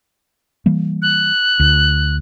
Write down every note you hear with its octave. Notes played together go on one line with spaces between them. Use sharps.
E3 G3 A#3
F#6
D2